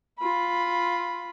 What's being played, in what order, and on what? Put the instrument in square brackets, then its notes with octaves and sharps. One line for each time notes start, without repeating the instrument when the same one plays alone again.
[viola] F4 B5